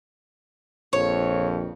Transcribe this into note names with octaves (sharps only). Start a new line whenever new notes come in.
A#1 F2 C#5